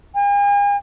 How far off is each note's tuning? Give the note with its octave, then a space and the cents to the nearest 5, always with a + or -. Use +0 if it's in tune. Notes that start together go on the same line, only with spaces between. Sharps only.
G#5 -45